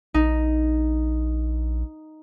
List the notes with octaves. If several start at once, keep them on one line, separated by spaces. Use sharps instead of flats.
A#1 D#4